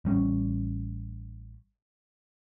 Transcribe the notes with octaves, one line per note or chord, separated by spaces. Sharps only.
A1 G3 C#4